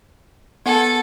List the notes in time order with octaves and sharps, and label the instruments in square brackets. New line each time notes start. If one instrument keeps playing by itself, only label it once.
[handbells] B3 F#5 G#5 [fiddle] A4